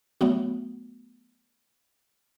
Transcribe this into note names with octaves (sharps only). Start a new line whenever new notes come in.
F#3 A3 B3 F#4